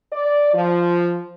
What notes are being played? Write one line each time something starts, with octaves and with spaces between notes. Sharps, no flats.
D5
F3